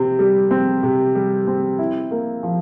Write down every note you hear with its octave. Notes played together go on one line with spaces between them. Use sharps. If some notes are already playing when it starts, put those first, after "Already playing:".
Already playing: C3 C4
G3
C4
C3
G3
C4
E4
A#3
F3